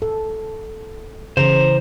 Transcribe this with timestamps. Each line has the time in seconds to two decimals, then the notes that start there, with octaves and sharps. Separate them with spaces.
0.02 A4
1.37 C#3 E3 C5 A#5